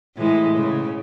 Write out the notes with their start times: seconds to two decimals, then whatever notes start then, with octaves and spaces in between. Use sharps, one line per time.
0.17 A2 E3 G#3
0.56 C#3